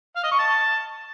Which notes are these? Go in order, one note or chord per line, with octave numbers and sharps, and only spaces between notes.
F5
D#5
C#6
A5